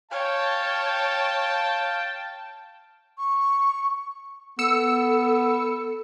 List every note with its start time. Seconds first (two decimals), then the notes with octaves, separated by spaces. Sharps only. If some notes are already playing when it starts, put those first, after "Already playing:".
0.11 C#5 F5 G5 A5
3.18 C#6
4.59 B3 A4 E6 C#7